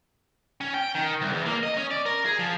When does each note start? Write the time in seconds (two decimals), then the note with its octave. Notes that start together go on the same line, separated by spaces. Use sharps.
0.61 C#4
0.74 G5
0.95 D#3
1.22 C2
1.33 E2
1.46 A#3
1.63 D#5
1.77 C#4
1.91 D5
2.06 A#4
2.26 G#4
2.39 F3